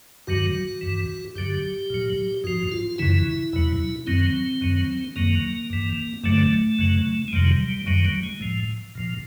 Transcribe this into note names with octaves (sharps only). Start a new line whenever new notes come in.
G2 D#3 F#3 F#4
G2 E3
G2 D3 F#3 G4
A#2 F#3
G#2 F3 F#4
F4
F#2 C#3 E3 E4
E2 B2 F#3
F#2 D#3 F#3 C4
F#2 D#3 F#3
F#2 D#3 F#3 A#3
G2 E3
G2 D3 F#3 A3
F#2 C#3 F#3
G#3
F2 C3 D#3 F#3 G3
F#2 D#3 F#3 G3
G3
G#3
A2 F3
A#2 F3